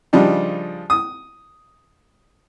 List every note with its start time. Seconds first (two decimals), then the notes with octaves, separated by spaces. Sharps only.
0.13 C#3 F3 G3 D4 D#4
0.90 D#6